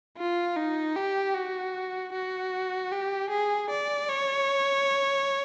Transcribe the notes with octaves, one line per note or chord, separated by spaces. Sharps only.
F4
D#4
G4
F#4
F#4
G4
G#4
D5
C#5